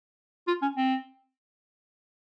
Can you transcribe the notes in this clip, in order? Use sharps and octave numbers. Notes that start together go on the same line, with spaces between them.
F4
C#4
C4